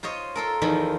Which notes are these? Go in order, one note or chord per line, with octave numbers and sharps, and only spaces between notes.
F4 C5 C#5 D#5
F4 A4 A#4
E2 D#3 F3 F4